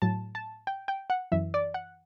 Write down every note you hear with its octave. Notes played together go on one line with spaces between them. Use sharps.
A2 F#3 A5
A5
G5
G5
F#5
F#2 E3 E5
D5
F#5